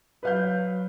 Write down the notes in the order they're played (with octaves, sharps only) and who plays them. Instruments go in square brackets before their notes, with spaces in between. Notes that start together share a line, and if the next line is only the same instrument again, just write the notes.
[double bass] F#3 [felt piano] B4 F5 G6